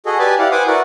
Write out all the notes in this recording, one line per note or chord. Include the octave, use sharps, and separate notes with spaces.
F#4 G#4 A4 D#5
G4 B4 D5 G#5 A5 B5
E4 G4 D5 F5 F#5
B4 C5 F#5 G#5 D6 D#6
E4 F#4 A#4 B4 D5 F#5